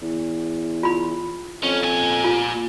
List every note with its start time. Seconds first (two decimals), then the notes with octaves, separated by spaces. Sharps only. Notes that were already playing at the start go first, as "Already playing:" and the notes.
0.02 E2
0.83 F4 B5
1.63 F2 C#4
1.83 A#2 G#5
2.24 F4